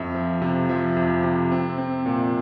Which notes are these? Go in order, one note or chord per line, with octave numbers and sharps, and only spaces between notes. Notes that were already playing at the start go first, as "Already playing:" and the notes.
Already playing: F2 E5
F3
C3
F3 E5
F2
C3
C4
C4
A#2